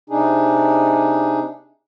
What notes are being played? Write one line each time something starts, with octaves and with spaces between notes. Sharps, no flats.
C3 D4 D#4 G#4